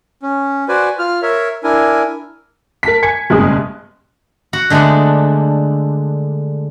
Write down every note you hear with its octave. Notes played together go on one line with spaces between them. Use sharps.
C#4
F#4 B4 C5 D5 G#5
F4 F6
A#4 C#5 E5
D4 E4 A#4 G#5
A#4 A5 B6
G#5 G#6 C#7
F#1 G2 B2 G#3 G#4 D#6
F#4 F#5
D3 G#3 A3 B3 D4